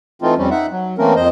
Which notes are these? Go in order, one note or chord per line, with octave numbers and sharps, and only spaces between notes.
E3 A3 C4 D#4 F4
F2 G3 C4 C#4
D#4 E5 F#5
F#3
E3 A3 A#3 C4 C#4 A#4
F2 C5 D#5